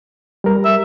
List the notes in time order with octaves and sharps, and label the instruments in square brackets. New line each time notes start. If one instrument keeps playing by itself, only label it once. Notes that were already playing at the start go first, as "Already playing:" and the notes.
[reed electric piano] G3 A#4
[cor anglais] E5